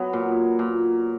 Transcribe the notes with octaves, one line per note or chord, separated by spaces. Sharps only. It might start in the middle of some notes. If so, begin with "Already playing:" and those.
Already playing: F#3 B3
A#2
A#2